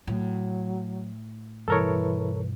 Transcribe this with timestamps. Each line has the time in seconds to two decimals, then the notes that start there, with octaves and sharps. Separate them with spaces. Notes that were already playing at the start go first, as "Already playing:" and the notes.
0.07 A2 F#3
1.68 G2 B2 E3 G3 A4 A#4 C#5